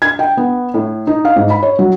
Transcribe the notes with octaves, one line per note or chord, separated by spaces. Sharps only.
G#6
G5
B3
A2
D#4
F5
G#2
B5
C#5
F#3